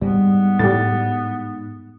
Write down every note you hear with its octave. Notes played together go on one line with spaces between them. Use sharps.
G#2 G3 B3
A2 G3 A6